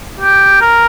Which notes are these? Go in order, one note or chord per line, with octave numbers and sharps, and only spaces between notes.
G4
A#4